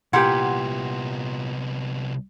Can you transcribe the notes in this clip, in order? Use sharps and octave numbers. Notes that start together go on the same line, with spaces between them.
C2 A#2 B3 E4 G4 F#5 C6 G#6